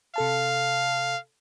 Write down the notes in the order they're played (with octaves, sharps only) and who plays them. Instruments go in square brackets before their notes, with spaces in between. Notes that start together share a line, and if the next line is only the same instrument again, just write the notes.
[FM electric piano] C3 A4 A5 [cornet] F5